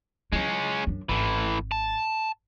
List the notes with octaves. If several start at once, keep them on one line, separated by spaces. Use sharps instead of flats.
F#3 G#3 C#4 E4
F#2 D4
G#1 A2 E3
A5